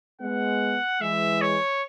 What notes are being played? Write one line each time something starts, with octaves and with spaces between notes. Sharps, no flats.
G#3 B3 F#5
E3 G#3 E5
C#5